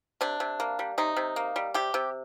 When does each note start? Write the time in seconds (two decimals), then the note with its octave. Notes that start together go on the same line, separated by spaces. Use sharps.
0.21 C3 D4
0.40 C3
0.60 A#3
0.79 G3
0.98 C3 D#4
1.16 C3
1.36 A#3
1.56 G3
1.74 C3 G4
1.94 C3